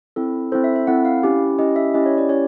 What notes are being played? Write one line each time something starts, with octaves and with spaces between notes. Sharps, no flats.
C4 E4 A4
C4 E4 A4 C5
E5
E5
C4 E4 A4 F#5
F5
C#4 E4 G4
C#4 E4 G4 D#5
E5
C#4 E4 G4 D#5
C#5
D5
C#4 E4 G4 C#5